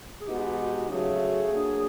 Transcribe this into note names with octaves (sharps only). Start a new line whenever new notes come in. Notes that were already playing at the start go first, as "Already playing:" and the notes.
G#4
B2 G#3 B3 D#4 F#4 G4
C#3 F#3 A3 G#4
F#3 A#3 D4